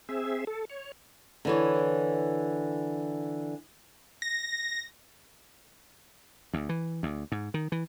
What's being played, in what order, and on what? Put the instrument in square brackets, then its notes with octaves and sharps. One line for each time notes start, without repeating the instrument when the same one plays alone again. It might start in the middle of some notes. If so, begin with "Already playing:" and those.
[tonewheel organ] C4 G#4 E5
A4
C#5
[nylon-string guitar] D3 E3 C#5
[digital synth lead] A#6
[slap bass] D2
E3
D2
G#2
D#3
E3